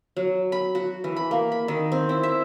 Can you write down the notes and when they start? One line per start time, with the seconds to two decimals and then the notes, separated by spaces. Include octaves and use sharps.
0.17 F#3
0.52 B5
0.75 F#4
1.04 E3
1.17 B5
1.31 A#3
1.52 B5
1.68 D#3
1.92 C4
2.09 E4
2.23 E5